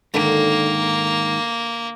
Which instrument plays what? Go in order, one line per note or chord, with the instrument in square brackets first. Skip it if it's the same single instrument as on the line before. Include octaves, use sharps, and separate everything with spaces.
[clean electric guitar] G#2 D#3 [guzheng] D3 [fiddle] A#3